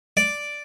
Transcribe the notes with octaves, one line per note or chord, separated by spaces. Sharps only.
D5